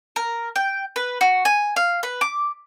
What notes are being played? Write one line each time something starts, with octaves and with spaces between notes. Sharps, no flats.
A#4
G5
B4
F#4
G#5
F5
B4
D6